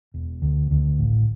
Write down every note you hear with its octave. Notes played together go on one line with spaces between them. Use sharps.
E1
D2
D2
A1